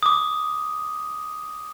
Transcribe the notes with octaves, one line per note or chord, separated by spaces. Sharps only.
D6 D#6